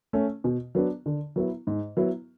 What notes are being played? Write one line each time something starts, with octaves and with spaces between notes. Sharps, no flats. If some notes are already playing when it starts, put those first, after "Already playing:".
A3 C#4
B2
F#3 B3 D4
D3
F#3 B3 E4
G#2
F#3 B3 E4